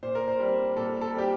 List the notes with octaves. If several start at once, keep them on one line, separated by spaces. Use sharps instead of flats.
A#2 C5
A#4
C5
G3 C4
A#2 A4
A4
G3 C4 G4